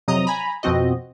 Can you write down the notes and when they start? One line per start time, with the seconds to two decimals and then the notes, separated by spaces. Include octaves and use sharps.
0.08 F2 C3 F#3 D#5 A#5 D#6
0.27 G#5 A#5 B5
0.63 F2 B2 F3 C4 F#4 D#5